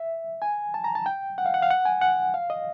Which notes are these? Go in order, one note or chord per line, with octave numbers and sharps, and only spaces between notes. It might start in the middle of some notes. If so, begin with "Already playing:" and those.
Already playing: E5
G#5
A5
A#5
A5
G5
F#5
F5
F#5
F5
F#5
G#5
F#5
F5
D#5